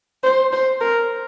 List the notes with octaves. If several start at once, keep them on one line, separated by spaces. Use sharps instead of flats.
C5
C5
A#4